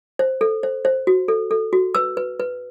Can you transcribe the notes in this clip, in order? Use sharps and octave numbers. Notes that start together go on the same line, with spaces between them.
C5
A4
C5
C5
F#4
A4
A4
F#4
B4 E6
B4
B4